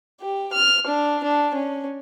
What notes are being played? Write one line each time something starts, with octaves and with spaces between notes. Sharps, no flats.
G4
F6
D4
D4
C#4